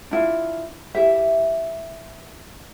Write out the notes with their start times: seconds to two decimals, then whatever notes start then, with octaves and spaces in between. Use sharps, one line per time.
0.11 D4 E4 F4
0.95 E4 G4 E5